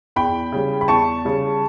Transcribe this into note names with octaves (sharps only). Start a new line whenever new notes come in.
E2 G5 B5
C#3 G3
B5
E2 A5 C#6
C#3 G3